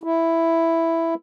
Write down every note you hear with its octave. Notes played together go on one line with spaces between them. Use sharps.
E4